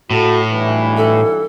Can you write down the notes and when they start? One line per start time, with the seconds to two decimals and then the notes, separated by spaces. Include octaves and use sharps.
0.11 A2 F#4 A4
0.50 B1 G2 E3
0.97 A4